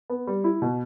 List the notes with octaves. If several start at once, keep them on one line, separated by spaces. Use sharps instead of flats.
B3
G3
E4
B2